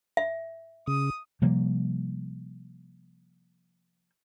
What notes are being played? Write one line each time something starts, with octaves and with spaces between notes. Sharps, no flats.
E5
C#3 D#6
C3 F3 G3 A#3